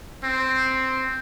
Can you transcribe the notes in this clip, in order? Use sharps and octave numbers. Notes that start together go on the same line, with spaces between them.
C4